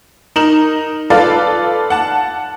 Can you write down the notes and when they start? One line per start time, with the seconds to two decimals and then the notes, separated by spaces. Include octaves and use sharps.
0.36 D#4 A#4 E7 F#7
1.10 F4 A4 B4 D5 F5
1.90 F#5 A5